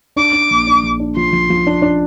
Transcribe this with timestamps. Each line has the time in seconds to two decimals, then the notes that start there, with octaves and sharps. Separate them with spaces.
0.16 D4 D6
0.33 D4
0.50 A#1
0.67 D4
0.83 A#1
1.00 D4
1.16 F3 C6
1.33 F3
1.50 F3
1.67 D4
1.82 D4